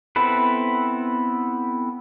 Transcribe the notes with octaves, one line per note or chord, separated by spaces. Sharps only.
B3 C4 E4 A4 B4